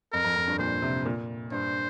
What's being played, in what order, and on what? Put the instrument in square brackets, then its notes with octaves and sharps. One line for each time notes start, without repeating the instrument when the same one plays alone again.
[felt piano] F2 [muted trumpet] A#4
[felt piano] F2
F2
G2
[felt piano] A#2 [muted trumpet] C5
[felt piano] C3
A#2
[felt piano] G2 [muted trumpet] C5